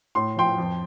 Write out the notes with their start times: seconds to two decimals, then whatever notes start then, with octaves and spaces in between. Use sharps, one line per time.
0.15 A2 C6
0.37 F3 G5 C6
0.58 F2